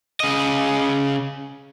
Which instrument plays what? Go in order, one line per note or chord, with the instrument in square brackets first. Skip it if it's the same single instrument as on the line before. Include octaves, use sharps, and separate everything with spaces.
[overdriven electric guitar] C#3 D#5